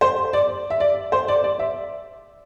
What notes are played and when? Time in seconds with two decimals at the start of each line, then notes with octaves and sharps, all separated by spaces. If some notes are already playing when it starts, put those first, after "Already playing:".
0.01 C5
0.33 D5
0.70 E5
0.80 D5
1.12 C5
1.28 D5
1.44 D5
1.59 E5